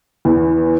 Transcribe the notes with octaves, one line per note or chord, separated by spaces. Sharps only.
E2